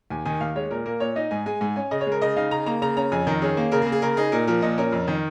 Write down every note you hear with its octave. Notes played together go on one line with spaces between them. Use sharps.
D#2 G#5
D#3 G#5
D#2 F5
G#3 C#5
A#2 A#4
A#3 A#4
A#2 C#5
D#4 D#5
G#2 G#5
G#3 G#5
G#2 G#5
C#4 G#5
C#3 D#5
C#5
G#3
A#4
C#3 D#5
D#4 F5
C#3 A#5
A#3 A#5
C#3 A#5
C#4 A#5
F2 G#5
D#3 A#4
C#4 G#4
A#3
C#3 A#4
G#4
A#3
G#4
C#3 A#4
D#4 G#4
A#2 A#4
F3 A#4
A#2 D#5
C#4 A#4
F2
D#3